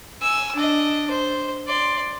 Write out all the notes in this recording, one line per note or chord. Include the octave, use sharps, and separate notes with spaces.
G#5 E6
D4 D#5
C5
D5 C6